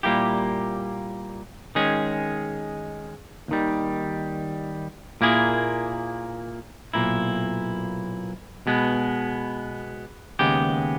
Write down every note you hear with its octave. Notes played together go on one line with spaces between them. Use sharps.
A#2 G3 A#3 E4 G4
D#3 G#3 C#4 G#4
D#2 D#3 G3
A#2 A#3 E4 G#4
B1 A#2 A#3 E4
B2 G#3 B3
D#2 C#3 G#3 B3 G4